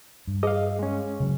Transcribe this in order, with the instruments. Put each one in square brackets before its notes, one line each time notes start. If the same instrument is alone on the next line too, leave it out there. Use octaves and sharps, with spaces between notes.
[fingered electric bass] G2
[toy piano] G#4 [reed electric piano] D#5 F5
[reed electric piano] G#3 C#4
[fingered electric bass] C#3 F#3